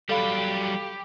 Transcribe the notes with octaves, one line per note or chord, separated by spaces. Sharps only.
F#3 G3 G4 A4 F5 B5